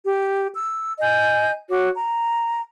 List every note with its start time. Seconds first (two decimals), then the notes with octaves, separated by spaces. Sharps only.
0.05 G4
0.55 E6
1.01 D#5 G#5 G6
1.69 F#4 C#5 D6
1.96 A#5